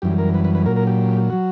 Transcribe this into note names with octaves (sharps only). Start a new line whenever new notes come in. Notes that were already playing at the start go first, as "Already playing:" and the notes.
F#2 E3 G3 G4
A#4
B4
B4
B4
A#2 F#3 A#4
A#4
G4
F#3 F#4